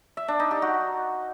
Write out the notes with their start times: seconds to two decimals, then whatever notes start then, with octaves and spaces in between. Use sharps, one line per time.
0.17 E5
0.28 D4
0.40 D#4
0.51 G4
0.62 F#4